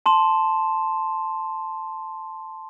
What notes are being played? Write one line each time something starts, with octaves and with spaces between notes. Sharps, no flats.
A5 C6 E7